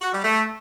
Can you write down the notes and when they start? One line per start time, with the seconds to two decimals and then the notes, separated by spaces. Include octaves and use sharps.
0.02 F#4
0.13 G3
0.24 A3